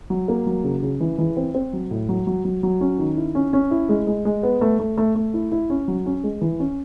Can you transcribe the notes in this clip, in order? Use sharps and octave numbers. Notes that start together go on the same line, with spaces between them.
F#3
A#3
F#3
C#3
C#3
E3
E3
C4
C4
F#3
A2
F#3
F#3
F#3
F#3
C#4
D#3
E4
C#4
C#4
E4
G#3
G#3
G#3
B3
A3
A3
A3
A3
E4
E4
C#4
F#3
C#4
G#3
E3
C#4